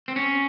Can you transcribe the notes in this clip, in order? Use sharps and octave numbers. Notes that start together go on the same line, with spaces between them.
C4
C#4